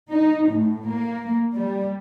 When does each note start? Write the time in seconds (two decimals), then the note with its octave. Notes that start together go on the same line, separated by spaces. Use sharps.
0.11 D#4
0.49 A2
0.87 A#3
1.54 G3